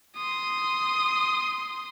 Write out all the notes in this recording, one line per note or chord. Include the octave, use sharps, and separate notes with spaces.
C6 D#6